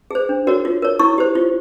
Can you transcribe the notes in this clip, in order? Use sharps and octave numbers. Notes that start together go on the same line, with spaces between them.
G#4 C5
D4
F#4 A#4 C#5
F4
A#4 C#5
E4 C#6
G4 C5
F4